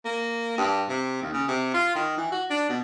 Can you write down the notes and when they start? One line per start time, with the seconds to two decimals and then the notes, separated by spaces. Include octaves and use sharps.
0.05 A#3
0.58 G2
0.89 C3
1.22 D#2
1.33 C#3
1.48 C3
1.74 F4
1.95 D#3
2.18 E3
2.32 F#4
2.50 D4
2.69 B2